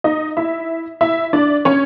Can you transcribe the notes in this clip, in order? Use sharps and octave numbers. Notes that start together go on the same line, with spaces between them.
D#4 D#5
E4 E5
E4 E5
D4 D5
C#4 C#5